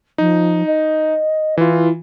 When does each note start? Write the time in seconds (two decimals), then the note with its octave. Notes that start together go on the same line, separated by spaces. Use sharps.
0.18 F3 D#4
0.66 D#5
1.57 E3 E4 F4